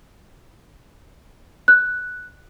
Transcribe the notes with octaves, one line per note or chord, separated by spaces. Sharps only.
F#6